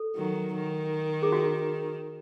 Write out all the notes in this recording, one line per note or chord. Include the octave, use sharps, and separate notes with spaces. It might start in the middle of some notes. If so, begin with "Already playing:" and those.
Already playing: A4
D#3 F#3
D#3
G#4
F#4